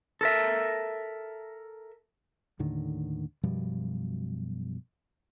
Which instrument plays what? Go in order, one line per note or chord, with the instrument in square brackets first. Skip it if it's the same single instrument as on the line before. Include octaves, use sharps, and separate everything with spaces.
[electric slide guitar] A4 A#4 E5
[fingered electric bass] D#2 A2 D3 D#3
F#2 B2 F3 G3